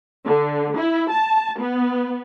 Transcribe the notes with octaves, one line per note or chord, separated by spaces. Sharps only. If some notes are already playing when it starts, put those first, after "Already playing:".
D3
E4
A5
B3